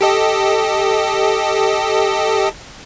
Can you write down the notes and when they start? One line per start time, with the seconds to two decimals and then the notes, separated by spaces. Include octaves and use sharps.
0.01 G4 A4 D#5